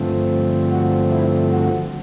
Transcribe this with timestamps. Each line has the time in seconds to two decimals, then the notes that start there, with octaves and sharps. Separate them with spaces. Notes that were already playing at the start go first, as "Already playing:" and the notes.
Already playing: G2 D3 F3 A3 C4
0.71 F#4
1.11 E4
1.52 F#4